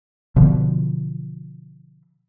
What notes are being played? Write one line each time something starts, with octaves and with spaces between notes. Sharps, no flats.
B2 D3 E3 F3